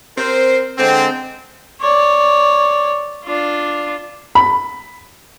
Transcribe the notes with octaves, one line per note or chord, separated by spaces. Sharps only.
C4 A#4 C5
D3 G#3 C4
C#5 D5
D4 F4
B5